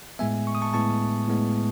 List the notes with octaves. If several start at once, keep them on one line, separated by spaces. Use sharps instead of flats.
A2 G#3 B3 E5 G#5
C#6
D#6
A5 C#6
A2 G#3 B3 A5 C#6
A2 G#3 B3